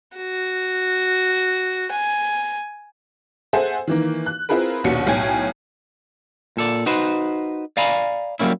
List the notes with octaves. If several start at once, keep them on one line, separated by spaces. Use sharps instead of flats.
F#4
G#5
G#4 A4 C5 E5 F#5 G#5
D#3 E3 A#3
F#6
C4 E4 F4 G#4 A#4 B4
A#1 D#2 B2 C#4 F#5 C#7
B1 A2 C#5 G5 G#5 G#6
A#2 A4 D5
D#4 F#4 B4 C5
D5 F5 G#5 A#5 B5
F#3 G3 A#3 C#4 E4